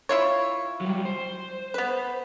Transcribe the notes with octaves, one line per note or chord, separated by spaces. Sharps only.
E4 F4 C#5
F#3 G3
C5
B3 B4